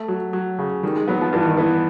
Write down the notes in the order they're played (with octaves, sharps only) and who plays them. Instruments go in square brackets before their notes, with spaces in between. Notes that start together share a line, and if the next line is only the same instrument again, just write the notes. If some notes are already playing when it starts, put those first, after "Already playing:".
Already playing: [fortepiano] A3
F#3
F#3
C#3
[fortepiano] D#3 [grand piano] G3
[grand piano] G#3
[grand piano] F#3 [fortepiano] B3
[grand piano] F3
[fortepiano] G2 [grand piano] E3
[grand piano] D#3
[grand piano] E3 [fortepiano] B3